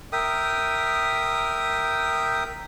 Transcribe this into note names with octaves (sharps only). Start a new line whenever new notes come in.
A#4 E5 G5 D#6